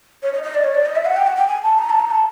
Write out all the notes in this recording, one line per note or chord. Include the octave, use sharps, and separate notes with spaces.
C#5
D#5
D#5
D5
C#5
D5
D#5
E5
F#5
G5
F#5
G5
G#5
A5
A#5
A5
A#5
A5